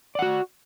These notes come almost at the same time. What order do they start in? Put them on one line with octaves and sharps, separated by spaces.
D5 F#5 F#4